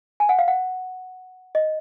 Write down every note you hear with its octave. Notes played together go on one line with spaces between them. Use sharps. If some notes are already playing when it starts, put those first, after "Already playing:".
G#5
F#5
F5
F#5
D#5